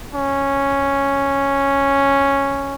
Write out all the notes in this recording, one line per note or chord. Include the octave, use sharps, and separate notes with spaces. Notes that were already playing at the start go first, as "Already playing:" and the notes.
C#4